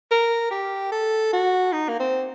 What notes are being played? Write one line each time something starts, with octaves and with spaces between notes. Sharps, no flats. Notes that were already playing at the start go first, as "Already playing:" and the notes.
A#4
G4
A4
F#4
D#4
A#3
C4